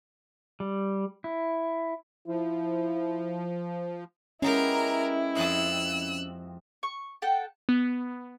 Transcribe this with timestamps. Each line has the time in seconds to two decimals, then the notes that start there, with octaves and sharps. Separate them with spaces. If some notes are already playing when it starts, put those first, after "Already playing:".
0.60 G3
1.24 E4
2.28 F3 E4
4.42 G#3 B3 C#4 E4 G4 A#4 A#5
5.35 F2 C4 D#5 E6 F#6
6.83 C#6
7.22 A4 F#5 G5 A5
7.69 B3